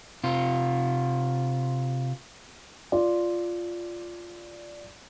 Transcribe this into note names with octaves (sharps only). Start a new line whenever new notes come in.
C3 F4
F4 D5